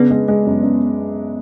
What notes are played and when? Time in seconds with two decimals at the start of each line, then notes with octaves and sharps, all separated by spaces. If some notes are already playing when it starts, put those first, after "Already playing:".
Already playing: C#3 B3 D4
0.11 G#3
0.28 G#3
0.46 F#2
0.63 F#2